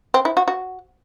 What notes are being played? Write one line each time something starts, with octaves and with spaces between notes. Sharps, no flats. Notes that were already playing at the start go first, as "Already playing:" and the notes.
C4
E4
F#4
F#4